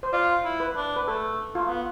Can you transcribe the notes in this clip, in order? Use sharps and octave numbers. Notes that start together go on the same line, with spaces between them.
C5
F4 D5
E4
B4
D4
B4
A3 A4
A3 F4
B3